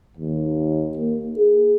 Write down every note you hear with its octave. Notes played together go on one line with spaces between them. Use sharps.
D#2
A#3
G#4